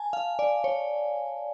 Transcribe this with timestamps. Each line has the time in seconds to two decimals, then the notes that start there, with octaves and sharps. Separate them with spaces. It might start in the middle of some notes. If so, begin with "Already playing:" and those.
Already playing: G#5 A5
0.13 F5
0.39 D5
0.64 C#5